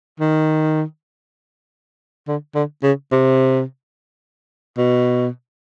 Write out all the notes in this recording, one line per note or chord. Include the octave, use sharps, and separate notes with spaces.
D#3
D3
D3
C#3
C3
B2